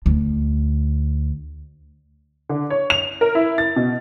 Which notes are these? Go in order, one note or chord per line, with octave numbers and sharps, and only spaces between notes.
D2
D3
C#5
F7
A#4
E4
A6
B2